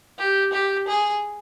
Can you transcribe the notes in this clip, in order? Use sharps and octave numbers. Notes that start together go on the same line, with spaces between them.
G4
G4
G#4